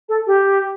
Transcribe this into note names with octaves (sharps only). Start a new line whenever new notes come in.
A4
G4